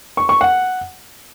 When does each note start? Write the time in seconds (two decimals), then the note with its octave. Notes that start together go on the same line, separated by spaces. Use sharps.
0.17 C#6
0.29 C#6
0.41 F#5